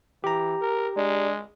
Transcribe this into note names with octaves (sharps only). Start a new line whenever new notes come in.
E3 G4 A#5
A#4
G#3 D4